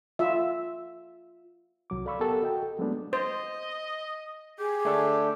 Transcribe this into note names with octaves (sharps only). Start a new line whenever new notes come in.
F4 E5
C2 F#3 D6
A4 D5 F5 B5 C#6 E6
B3 G4 A4 A#4 F#5
F#4 D#5 G5
A4
F#3 G#3 A3 B3 D4
C5 D#5
G4 G#4
A3 D4 A4